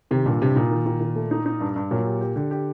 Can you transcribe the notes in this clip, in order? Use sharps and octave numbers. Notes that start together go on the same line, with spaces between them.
C3 D#3
G2 A#2
G2 C3
A#2 D#4
D#3
D#3
D#3
A3
D#4
D#4
G2
G2
A#2 F#3
G4
G4
D3 G4
G4